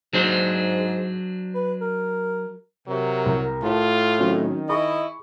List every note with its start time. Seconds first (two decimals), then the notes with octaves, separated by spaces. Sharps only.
0.13 G#2 F#3 D4 C5
1.55 B4
1.81 A#4
2.88 C3 F#3 A#4
3.26 C2
3.63 A2 F4 A5
4.19 D#3 F#3 C4 C#4
4.69 E4 G#4 D#5 B5 C#6